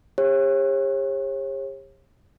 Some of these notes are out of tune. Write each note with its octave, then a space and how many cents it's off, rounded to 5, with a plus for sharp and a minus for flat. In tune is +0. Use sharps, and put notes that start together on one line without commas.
G4 +40 C#5 -40